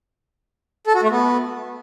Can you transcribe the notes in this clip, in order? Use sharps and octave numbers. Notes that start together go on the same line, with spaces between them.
A4
F#4
A3
B3